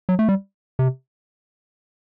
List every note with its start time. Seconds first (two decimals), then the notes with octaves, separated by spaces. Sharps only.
0.09 F#3
0.19 A3
0.29 G3
0.79 C3